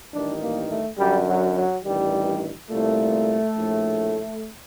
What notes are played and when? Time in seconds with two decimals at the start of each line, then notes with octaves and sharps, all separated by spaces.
0.13 A1 G2 D#3 D4
0.42 A#3
0.70 A3
0.99 F#2 D3 G3
1.28 F#3
1.56 F#3
1.84 A1 G2 D#3 G3
2.69 C2 A#2 A3
3.55 A#1 A2